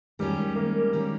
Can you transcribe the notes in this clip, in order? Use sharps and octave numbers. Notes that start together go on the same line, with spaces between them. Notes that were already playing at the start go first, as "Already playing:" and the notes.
D#3 G3 G#3 C#4 G4
A#3
D#3 G#3 C#4 G4